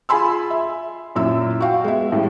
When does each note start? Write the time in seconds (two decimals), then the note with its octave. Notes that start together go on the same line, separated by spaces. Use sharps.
0.09 F4 G#4 G#5 B5 C6 E6
0.50 E5
1.15 F#2 A#2 E4 E6
1.60 F#4 F5 G5
1.84 G#3 B3 E5
2.12 A2 G3